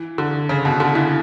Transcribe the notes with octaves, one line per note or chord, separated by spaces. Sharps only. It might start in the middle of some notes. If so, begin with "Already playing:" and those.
Already playing: E3
D3
C#3
B2
D3
E3